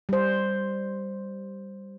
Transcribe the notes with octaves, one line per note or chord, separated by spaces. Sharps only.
G3 C5